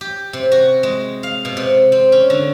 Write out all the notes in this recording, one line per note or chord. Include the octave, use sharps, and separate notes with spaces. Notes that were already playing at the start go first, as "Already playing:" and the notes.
G4
C3
F#4
G#3
F5
B2
C3
C4
C#4
D3